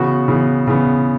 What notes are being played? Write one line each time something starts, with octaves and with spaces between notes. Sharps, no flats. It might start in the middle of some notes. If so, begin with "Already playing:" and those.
Already playing: C#3 E3 B3 F#4
C#3 E3 B3
C#3 E3 B3